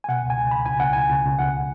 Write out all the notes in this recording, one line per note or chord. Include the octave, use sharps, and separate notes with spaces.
G#5
B2 F#5
C#2
G#5
C#2
C#2 B5
C#2 G#5
C#2 F#5
C#2 G#5
C#2
C#2
C#2 F#5